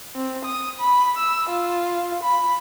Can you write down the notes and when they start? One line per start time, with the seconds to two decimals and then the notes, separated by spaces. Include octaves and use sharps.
0.15 C4
0.45 D#6
0.80 B5
1.17 E6
1.50 F4
2.23 B5